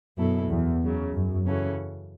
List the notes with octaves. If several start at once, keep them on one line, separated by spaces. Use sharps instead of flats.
F#2 B2 B3 E4 A4
E2
F#2 C#3 F#3
F#2
C#3 E3 C#4 F#4 A4